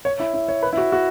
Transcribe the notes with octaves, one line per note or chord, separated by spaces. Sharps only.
C#5
E4
E4
C#5
B4
E4
F#4
F#4